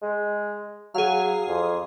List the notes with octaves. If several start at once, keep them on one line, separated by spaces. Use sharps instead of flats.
G#3
F#3 G#4 F5
F2